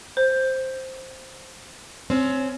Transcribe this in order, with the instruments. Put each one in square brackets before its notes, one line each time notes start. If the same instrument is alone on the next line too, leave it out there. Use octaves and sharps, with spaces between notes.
[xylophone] C5
[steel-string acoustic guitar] C4 C#4